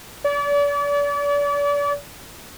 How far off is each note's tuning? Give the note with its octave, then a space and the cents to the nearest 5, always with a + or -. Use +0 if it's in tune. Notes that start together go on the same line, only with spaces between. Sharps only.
D5 -40